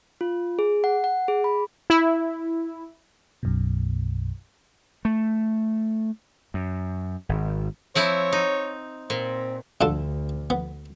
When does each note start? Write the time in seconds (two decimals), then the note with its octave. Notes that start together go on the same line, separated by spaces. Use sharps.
0.21 F4
0.59 G#4
0.84 F#5
1.04 F#5
1.28 G#4
1.44 B5
1.90 E4
3.43 B1 F#2 B2
5.05 A3
6.54 F#2
7.29 G#1
7.95 F3 C4 E4 C#5
8.33 D#4
9.10 A#2 C4
9.81 D2 D3 F4 A4
10.50 B3